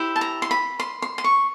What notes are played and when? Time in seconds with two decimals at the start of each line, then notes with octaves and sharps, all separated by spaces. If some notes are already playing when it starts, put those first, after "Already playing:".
Already playing: E4 G4 C5
0.16 A5
0.21 A#5
0.42 C6
0.51 B5
0.80 C6
1.02 C6
1.18 C6
1.24 C#6